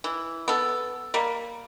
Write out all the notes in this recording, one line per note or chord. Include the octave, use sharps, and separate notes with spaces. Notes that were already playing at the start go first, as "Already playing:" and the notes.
E3
B3 A4
G3 A#3